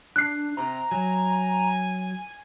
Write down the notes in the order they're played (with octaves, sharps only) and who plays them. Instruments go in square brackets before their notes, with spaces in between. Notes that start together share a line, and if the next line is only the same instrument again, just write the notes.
[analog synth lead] D4 [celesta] F#6 C7
[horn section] C3 [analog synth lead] A#5
[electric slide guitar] F#3 [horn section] G#5